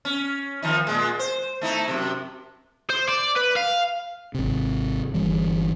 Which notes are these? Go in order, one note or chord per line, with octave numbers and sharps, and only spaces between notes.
C#4
D#3 F3 D#4
A#2 G#3
C5
A3 D#4 E4
F#2 A2 C3
C5
D5
B4
F5
G#1 C3
G1 E3 G3